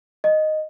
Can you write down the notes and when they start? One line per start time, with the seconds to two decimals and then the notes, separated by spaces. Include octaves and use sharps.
0.24 D#5